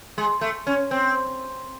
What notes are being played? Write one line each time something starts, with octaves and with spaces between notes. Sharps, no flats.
G#3
A3
C#4
C4